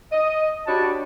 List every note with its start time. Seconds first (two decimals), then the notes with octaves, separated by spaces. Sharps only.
0.12 D#5
0.67 D4 F#4 G4 C#5 A5 B5